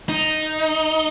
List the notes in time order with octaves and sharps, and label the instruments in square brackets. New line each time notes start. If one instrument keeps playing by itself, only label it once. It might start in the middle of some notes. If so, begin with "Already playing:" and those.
[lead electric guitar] D#4